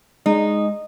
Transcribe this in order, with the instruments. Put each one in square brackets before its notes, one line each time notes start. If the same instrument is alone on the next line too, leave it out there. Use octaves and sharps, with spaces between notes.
[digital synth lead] G#3 [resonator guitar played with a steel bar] D#4